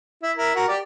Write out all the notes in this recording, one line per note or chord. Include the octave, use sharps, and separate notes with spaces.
E4
E4 A#4
F#4 A#4
G4 D5